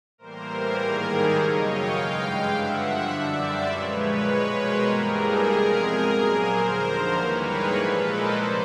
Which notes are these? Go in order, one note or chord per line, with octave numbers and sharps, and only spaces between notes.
A2 E3 G3 A#3 A#4 C5
G#2 D#3 G3 A#3 G#4 A#4
G4 A4
F#2 C#3 F#3 C#5 D#5
F5 G5
G2 E3 G#3 F5 G5
F5 G5
G2 D3 F3 E5 F#5
E5 F#5
F#2 D3 G3 D5 E5
C5 D5
A#2 F3 G#3 B4 C#5
B2 G#3
A#4 C5
G2 E3 G3 A#3 G#4 A#4
G4 A4
E2 C3 F3 G#3 G#4 A#4
A#2 F#3 A#3
A#4 C5
D#2 D3 F3
G#2 E3 G3 A#3 B4 C#5
G#4 A#4
A#2 F3 G#3 A4 B4
A#4 C5
F2 C3 C5 D5